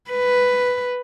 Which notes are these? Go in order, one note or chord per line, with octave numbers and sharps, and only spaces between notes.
B4